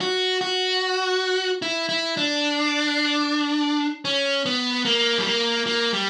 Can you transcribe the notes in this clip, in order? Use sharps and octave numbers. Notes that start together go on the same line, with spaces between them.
F#4
F#4
E4
E4
D4
C#4
B3
A#3
G3
A#3
A#3
G3